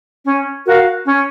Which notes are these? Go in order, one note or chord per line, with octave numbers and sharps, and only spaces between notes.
C#4
F#4 A#4 F5
C#4